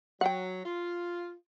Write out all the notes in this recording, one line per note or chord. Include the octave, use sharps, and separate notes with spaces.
F#3 F#5 G5
F4